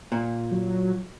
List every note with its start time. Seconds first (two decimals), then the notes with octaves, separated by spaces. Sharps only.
0.12 A#2
0.52 F#3